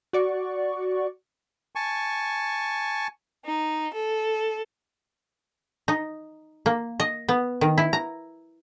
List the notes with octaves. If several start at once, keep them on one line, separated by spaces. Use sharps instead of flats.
F#4 D5 C#6
G#5 A5 C#6
D#4
A4
D#4
A#3
D#5
B3
D#3
E4
A#5